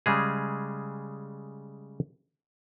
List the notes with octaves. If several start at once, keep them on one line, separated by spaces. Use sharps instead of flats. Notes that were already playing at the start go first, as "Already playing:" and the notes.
C#3 G3 G#3 G#4